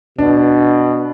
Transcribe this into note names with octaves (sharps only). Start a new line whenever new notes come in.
B2 D4